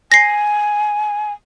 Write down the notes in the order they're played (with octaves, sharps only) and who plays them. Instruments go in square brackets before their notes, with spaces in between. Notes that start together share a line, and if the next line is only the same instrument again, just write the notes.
[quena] G#5 [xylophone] A#6 C7